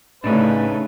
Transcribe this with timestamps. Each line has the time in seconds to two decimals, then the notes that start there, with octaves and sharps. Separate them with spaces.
0.24 A2 C#3 A3 D4 D#4 G#4 B4